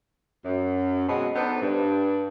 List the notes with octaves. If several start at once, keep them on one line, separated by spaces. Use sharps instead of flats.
F#2
B2 F#3 G#3 C4 D#5
B3 D4 D#4 A4 C5
G2